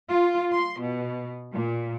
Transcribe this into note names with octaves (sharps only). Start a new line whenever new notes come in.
F4
C6
B2
A#2